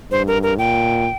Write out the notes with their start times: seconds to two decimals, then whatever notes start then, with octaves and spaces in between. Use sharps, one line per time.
0.11 G2 C5
0.27 A#4
0.43 A#4
0.58 A#2 G5